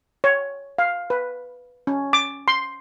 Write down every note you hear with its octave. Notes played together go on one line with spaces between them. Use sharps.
C#5
F5
B4
C#4
D6
C6